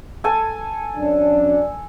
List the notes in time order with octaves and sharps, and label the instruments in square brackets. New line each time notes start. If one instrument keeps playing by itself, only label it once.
[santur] A4 G#5
[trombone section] F#2 D4